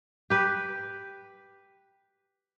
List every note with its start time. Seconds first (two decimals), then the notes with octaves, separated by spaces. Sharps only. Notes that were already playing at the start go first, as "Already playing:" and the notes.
0.30 G4 B4